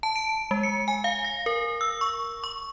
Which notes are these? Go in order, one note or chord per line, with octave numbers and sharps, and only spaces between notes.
A5
D7
G#3
C#7
G#5
F5
A#6
A#4
E6
C#6
C#6